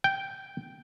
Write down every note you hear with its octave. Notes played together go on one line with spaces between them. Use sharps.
G5